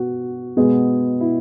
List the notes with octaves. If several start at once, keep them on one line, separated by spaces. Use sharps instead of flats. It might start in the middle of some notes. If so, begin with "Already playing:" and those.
Already playing: B2 B3 F#4
B2 G#3 B3 G#4
E4